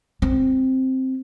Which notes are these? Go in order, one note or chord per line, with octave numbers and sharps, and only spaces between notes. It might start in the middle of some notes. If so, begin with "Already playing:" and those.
C4